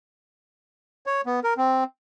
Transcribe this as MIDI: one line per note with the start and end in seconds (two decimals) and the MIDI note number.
1.06 1.21 73
1.26 1.40 59
1.44 1.54 70
1.57 1.84 60